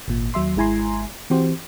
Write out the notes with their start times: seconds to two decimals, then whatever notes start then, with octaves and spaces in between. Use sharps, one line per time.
0.08 G#1 A#2
0.34 D#2 F#3 E5 C6
0.56 G#1 G#3 E4 G#5 A#5 C6
1.30 E3 C4 F#4 G4 C5